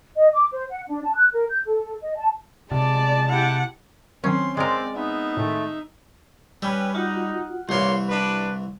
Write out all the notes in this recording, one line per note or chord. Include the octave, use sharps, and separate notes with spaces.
D#5
D6
C5
F#5
D4
A5
F#6
A#4
G6
A4
D#5
A5
C3 G#3 D5 A5
E4 G4 F#5
D#3 F#3 C4 C#4 C6 C7
G#3 C4 A#4 D5
B3 D#4 E5
A2 D#3 A3
G3 C#4 B4 G5 E6
D#4 F4 F#4 F#5
C2 E3 A#3 G4 C#5 C6
D4 B4